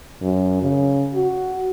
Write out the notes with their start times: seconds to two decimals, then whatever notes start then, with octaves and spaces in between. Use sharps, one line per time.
0.22 F#2
0.62 C#3
1.14 F#4